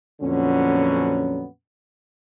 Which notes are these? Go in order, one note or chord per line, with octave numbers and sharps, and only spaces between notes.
F2 A#2 D3 F#3 B3 C#4